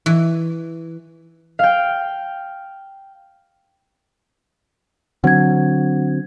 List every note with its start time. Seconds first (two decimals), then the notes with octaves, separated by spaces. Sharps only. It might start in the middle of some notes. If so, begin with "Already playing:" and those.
0.06 E3
1.59 F5 G5
5.24 D3 F#3 C4 F#5 G#6